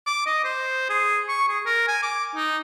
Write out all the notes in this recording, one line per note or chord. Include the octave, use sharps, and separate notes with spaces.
D6
D#5
C5
G#4
C#6
G#4
A#4
G#5
D6
D#4